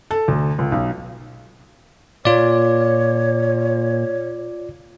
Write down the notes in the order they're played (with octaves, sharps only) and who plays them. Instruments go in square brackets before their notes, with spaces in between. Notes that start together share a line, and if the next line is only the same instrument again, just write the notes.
[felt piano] A4
D2
C#2
B1
[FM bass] A#2 [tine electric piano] F4 D5 [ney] C#5